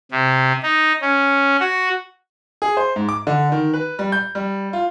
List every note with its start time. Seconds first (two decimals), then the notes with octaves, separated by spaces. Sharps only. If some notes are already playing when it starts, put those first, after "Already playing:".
0.11 C3
0.63 D#4
1.01 C#4
1.60 F#4
2.62 G#4
2.77 C5
2.96 G#2
3.09 D6
3.27 D3
3.52 D#3
3.74 B4
3.99 G3
4.12 G6
4.35 G3
4.73 F4